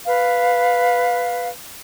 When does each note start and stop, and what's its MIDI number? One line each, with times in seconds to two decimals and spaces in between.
0.06 1.48 71
0.06 1.48 77